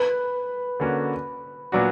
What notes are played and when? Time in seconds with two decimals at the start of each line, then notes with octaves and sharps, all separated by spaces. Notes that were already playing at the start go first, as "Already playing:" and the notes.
Already playing: B4
0.80 D3 A#3 C#4 F#4
1.72 A#2 F#3 B3 D4 F#4